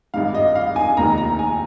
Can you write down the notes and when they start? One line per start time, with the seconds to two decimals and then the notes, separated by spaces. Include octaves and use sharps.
0.14 G#1 G2 D#3 F5
0.34 D#5
0.55 F5
0.76 G#5
0.97 F1 D#2 D#3 A#5
1.18 A#5
1.39 G#5